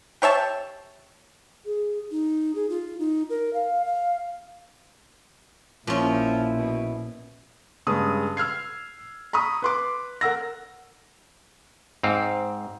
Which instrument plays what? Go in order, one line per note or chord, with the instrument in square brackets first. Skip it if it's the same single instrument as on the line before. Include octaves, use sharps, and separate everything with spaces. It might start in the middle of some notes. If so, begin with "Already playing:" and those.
[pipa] G4 C#5 E5 A5
[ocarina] G#4
D#4
G#4
F4
D#4
A#4
F5
F5
[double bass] A#1 [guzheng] A#2 C#4 [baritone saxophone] F3 [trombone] E4
[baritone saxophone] B2
[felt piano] G2 C#3 G#3 D#6
E6 F6 G#6 C7
A#5 B5 C#6 D#6
B4 C6 D6
A#4 F#5 E6 A#6
[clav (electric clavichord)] G#2 C4 F5